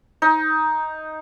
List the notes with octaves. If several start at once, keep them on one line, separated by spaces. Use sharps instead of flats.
D#4